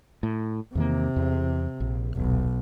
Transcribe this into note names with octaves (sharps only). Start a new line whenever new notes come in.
A2
E2 C3 D#3 A#3
E2
A#1
D#1 B1